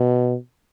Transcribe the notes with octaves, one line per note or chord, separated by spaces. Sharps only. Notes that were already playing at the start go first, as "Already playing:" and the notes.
Already playing: B2